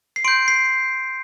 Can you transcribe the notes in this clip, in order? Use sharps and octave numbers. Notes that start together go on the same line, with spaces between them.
C7
C6 G6 D7
C7